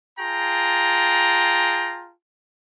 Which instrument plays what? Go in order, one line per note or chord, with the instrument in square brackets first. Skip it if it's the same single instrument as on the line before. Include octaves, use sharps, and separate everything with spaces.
[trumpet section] F4 G#4 G5 A5 A#5